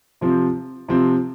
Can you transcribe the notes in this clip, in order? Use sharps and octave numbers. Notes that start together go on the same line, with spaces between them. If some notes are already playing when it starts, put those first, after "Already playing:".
C3 F3 C4
C3 F3 C4